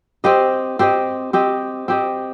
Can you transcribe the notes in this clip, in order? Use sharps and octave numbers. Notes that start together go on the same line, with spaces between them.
C4 G4 C5 D#5
C4 G4 C5 D#5
C4 G4 C5 D#5
C4 G4 C5 D#5